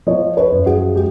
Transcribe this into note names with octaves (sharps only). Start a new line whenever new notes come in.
F3 C#5 D#5
B4 C#5
F#2
F#4 G#4
G#3 G4